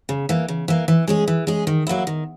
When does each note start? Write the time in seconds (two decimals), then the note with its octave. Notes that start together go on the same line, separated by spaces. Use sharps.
0.09 C#3
0.29 E3 A#3
0.48 C#3
0.68 E3 A#3
0.88 E3
1.07 G#3 C#4 G#4
1.28 E3
1.47 G#3 C#4 G#4
1.67 D#3
1.87 F#3 A#3 E4
2.07 D#3